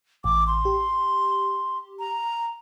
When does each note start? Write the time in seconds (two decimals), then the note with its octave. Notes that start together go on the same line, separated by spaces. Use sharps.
0.24 A1 D6
0.47 C6
0.65 G4
1.99 A#5